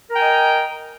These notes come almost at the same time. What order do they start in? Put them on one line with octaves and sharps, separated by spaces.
A#4 A#5 G5 G#5 D#5